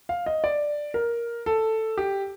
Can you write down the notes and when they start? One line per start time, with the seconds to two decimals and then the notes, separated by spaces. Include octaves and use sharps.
0.09 F5
0.26 D#5
0.44 D5
0.94 A#4
1.46 A4
1.98 G4